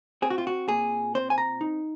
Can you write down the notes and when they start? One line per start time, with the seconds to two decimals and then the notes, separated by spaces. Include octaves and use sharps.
0.22 C4 G#4
0.30 F#4
0.38 F4
0.47 F#4
0.68 A#2 G#4
1.15 C4 C5
1.30 G#5
1.38 A#5
1.61 D#4